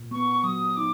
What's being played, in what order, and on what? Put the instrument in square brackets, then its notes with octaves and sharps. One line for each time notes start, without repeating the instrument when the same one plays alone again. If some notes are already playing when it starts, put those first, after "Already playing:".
Already playing: [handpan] A#2
[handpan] B3 [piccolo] C#6
[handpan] F#3 [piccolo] D#6
[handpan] D#4 [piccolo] D6